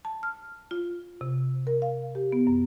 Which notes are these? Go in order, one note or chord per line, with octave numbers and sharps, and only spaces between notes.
A5
F6
F4
C3
A#4
F5
G4
B3
F#2